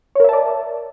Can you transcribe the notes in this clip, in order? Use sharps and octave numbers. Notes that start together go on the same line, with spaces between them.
A#4 C#5 D5 E5 A5